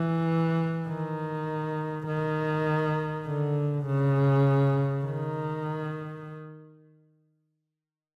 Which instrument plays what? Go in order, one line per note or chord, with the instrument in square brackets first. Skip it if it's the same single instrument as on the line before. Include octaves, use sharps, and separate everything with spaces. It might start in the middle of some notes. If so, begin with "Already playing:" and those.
Already playing: [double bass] E3
D#3
D#3
D3
C#3
D#3